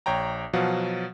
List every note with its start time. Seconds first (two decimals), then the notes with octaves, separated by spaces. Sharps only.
0.06 A#1 C#5 G5 A#5
0.53 B2 F3 F#3 F5 F#5